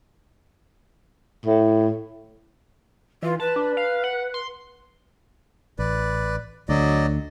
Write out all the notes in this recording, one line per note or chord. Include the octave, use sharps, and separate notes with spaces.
A2
E3 F4
B4 A5
D4
F5
F#5
C6
A1 B4 D5
D2 D3 F#3 D5 D#5